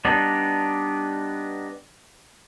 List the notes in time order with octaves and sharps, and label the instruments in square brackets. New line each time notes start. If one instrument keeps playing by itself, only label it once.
[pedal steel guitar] G3 B3 D4 D#4